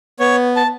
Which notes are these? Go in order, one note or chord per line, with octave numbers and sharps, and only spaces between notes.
B3 C#5
A5